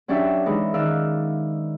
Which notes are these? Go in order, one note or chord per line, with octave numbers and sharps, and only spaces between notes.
F#3 C#4 D4 G4 D5 E5
E3 G#3 D#4
D#3 D5 F5 E6 F#6